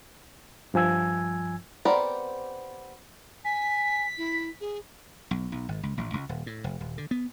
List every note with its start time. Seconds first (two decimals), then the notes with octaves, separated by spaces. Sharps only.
0.74 G2 F3 G#5 E6 G#6
1.85 B3 C4 G4 A#4 D5
3.45 G#5 B6
4.18 E4
4.61 G#4
5.31 B1
5.52 B1
5.69 G#1
5.83 C#2
5.98 A1
6.14 C#2
6.29 D#1
6.46 A2
6.64 F1
6.81 D#1
6.98 D3
7.11 B3